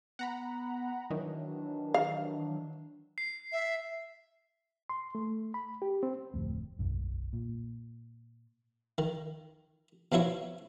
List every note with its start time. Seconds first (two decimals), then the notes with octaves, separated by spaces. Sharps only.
0.19 B3 F#5 A#5 B5
1.10 D#3 E3 F#3 D4
1.94 F5
3.18 C7
3.52 E5
4.90 C6
5.15 A3
5.54 B5
5.82 G4
6.03 C4
6.34 D1 F2 A3
6.79 E1 B1 F#2
7.33 A#2
8.98 D#3
10.12 B2 F3 F#3 E4 C#5